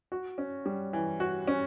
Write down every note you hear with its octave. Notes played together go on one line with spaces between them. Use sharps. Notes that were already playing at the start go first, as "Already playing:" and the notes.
F#4
C#4
G3
E3
F#4
C#4